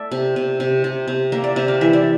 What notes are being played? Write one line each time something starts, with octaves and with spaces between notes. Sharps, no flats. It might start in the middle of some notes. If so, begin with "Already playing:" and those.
Already playing: A3 D5 E5
C3
C3
C3
C3
C3
A#3 E5
D5
C3 E5
F5
E3 E5
D5